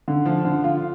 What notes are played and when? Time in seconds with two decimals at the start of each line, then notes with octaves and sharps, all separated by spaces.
0.08 D3
0.26 F3
0.45 D3
0.64 F4